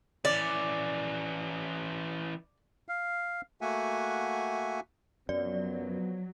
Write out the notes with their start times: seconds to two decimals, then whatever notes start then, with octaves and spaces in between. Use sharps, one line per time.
0.25 E3 C#4 D5
2.88 F5
3.61 A3 A#3 F#4 E5 F#5 G#5
5.29 F#2 C3 F3 F#3 B3 D5